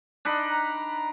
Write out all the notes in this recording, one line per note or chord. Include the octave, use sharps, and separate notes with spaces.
D4 D#4 B5
A#5